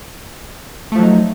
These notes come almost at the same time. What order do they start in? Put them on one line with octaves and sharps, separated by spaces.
A3 F3 F#3 D#4